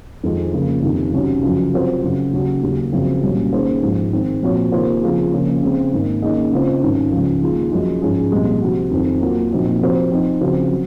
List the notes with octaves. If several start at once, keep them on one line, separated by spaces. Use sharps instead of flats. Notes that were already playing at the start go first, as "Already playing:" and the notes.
F2 D#3 G#3 C4 F4
C#3 F3 A#3
F2 C3 D#3
C#2 C3 D#3 F#3 C#4
F#2 C#3 F3
C3 F#3 C4 F4 C5
F#2 C#3 F#3
D#2 C#3 F#3 C#4
D#2 C#3 F#3
F#2 C#3 F3 C4
C2 A#2 F#3 C#4
D#3 A#3 C#4 G#4 C5
G#2 F3 G#3
D#3 G#3 C4
A#2 F3 C4 F#4 C#5
C3 D#3 A#3 F4 C5
C#3 F3 C4 F4 G#4
C#3 F3 A#3 C#4
C#3 G#3 C4
G#2 D#3 A#3 D#4
D#3 A#3 C#4 G#4 D#5
C#3 G#3 C4 F4 C5
G#2 D#3 F#3 C#4
C#2 C#3 F3
D#3 A#3 F4 G#4
F#2 F3 G#3 C#4
G#2 F3 G#3 C#4 G#4
C2 A#2 F3 G#3 C4
C3 F3 C4 F#4
F2 D#3 F#3 C4
F#3 A#3 F4
A#2 F3 C4 D#4 F#4
C3 F3 C4 F#4 C5
F3 C4 D#4
C#3 F3 C4 F#4 C5
F#3